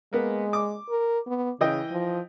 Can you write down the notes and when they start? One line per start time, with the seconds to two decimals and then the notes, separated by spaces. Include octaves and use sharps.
0.13 G#3 A#3 B3
0.53 D6
0.90 A#4
1.27 B3
1.61 C#3 E3 D#5 G5
1.91 F3